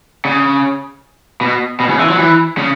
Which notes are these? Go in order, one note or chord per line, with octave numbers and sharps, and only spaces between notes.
C#3
B2
B2
C#3
E3
F#3
E3
C#3